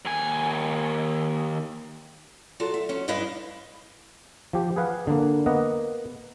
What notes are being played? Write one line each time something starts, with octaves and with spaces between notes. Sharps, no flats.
D#2 G#5
F#3 F4 F#4 A4 D5
E5
F#3 C#4
G2 G3 E4 B4 D#5 F5
F3 G4
G#4 B4 F5 F#5
D3 A#3
A#3 B3 D#5 F#5